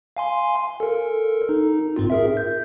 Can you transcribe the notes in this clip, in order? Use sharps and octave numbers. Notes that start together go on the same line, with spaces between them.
F5 G#5 C6
A4 A#4
D#4
G#2 C4 F4
G#4 A#4 E5
G6